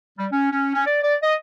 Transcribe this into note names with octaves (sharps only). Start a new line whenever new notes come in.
G3
C#4
C#4
C#4
D5
D5
D#5